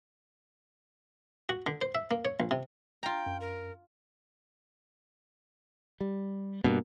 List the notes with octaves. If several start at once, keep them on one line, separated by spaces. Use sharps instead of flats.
F#4
D3
C5
E5
A#3
C#5
A#1
C3
F4 G5 A#5
F#2
A#4
G3
G2 B2 A#3 B3